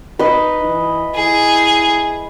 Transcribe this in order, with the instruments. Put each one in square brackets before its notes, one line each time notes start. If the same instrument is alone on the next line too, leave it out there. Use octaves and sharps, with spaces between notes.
[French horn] D#4 [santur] B4 D#5
[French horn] E3
[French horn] E4 [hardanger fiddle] G#4